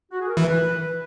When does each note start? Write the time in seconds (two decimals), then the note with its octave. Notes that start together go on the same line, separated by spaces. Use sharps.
0.11 F#4
0.20 G#4
0.29 A#4
0.37 E3 B4